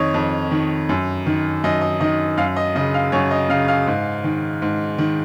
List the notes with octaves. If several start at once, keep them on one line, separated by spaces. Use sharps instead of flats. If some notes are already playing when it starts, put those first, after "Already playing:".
Already playing: F2 D#3 C#5 D#5
F2
D#3
F#2
D#3
F#2 D#5
D#5
D#3 D#5
F#2 F5
D#5
C#3 D#5
F5
F#2 C#5
D#5
C#3 F5
F5
G#2
D#3
G#2
D#3